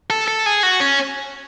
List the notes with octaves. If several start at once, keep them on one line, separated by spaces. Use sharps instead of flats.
A4
A4
G#4
F#4
C#4